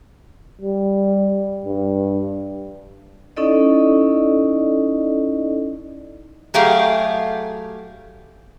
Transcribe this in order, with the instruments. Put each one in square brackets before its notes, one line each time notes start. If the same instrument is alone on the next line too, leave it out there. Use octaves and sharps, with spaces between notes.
[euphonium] G3
G2
[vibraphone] C#4 D#4 E4 A4 D5 D#5
[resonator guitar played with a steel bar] F#3 A3 G4 G#4 F5